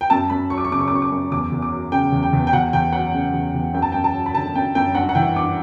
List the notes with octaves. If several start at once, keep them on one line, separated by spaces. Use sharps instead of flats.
G5
F#2 A5
F#2 B5
F#3 C#6
D6
C#6
C#3 D6
C#6
D6
F#2 C#6
D6
F#2 C#6
E2 D6
E2
D6
F#3
C#3 G5
E2
G5
E2
G5
E2 F#5
E2 G5
F#3 F#5
C#3
E2
E2
F#2 G5
A5
F#2 G5
A5
F#3
B5
D3 A5
F#2 G5
F#2 G5
G2 F#5
F#5
E3 G5
G2 D6